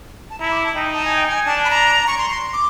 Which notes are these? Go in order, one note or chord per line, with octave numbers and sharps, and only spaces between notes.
A5
E4 A#5
D6
A5
D#4 G5
A5
G#5
G5
G#5
D4 A5
B5
A#5
C#6
C6
C6
D6